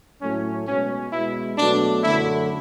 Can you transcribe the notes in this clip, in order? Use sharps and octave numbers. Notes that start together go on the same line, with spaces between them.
A2 F#3 A3 C#4
B2 G#3 C#4
B2 G#3 E4
B2 F#3 A3 D4
F#2 D3 A3 E4